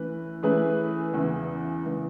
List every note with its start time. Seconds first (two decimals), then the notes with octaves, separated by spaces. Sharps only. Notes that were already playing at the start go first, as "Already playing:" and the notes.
Already playing: E3 A3 C#4 B4
0.43 E3 A3 C#4 G#4 B4
1.14 E2 C#3 E3
1.86 C#3 E3